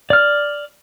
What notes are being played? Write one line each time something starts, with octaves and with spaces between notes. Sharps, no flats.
D5 F6